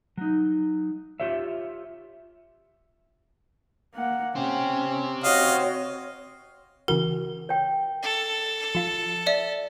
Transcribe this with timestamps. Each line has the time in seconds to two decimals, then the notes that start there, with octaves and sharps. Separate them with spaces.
0.17 F#3 D#4
1.20 F4 G4 C#5 E5
3.94 A#3 F#5
4.36 C4 C#4 G4
5.24 F#4 C#5 D#5 F5
6.88 C#3 E3 F#4 A#4
7.49 C#5 G5
8.03 A4
8.75 F3 F4
9.26 D5 E5